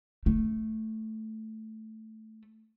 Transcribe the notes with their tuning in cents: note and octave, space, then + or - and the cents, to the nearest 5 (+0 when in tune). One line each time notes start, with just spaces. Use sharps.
A3 +0